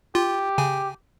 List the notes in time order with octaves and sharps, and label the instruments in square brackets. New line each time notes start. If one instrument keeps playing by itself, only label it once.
[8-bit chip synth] F4 [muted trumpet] G4
[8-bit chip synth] C#3 G#5